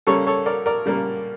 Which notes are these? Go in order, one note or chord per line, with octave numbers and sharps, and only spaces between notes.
C#3 G3 A#3 A4 C#5
A4 C#5
A#4 D5
A#4 D5
C#3 G3 A#3